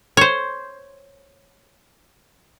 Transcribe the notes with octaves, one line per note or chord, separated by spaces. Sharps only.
C5 C#5